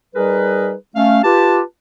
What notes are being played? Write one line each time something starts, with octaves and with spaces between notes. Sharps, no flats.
G3 D#4 G#4 A#4 B4
A3 C#4 F5
F4 G4 B4 A5